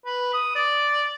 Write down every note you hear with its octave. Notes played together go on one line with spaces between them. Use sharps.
B4
D#6
D5